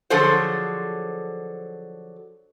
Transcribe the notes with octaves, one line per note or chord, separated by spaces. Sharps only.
D3 F3 F#3 G#4 A4 C5